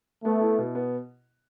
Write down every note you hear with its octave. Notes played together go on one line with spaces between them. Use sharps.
A3 B3
E4
B2
B3